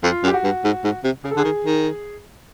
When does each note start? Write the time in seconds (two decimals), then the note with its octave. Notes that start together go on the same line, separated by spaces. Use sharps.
0.03 F2 F4
0.23 F#2
0.27 G4
0.34 F#4
0.44 G2
0.64 G#2
0.84 G#2
1.04 C3
1.24 C#3 G#4
1.31 A4
1.36 D3 G#4
1.44 D#3
1.65 D#3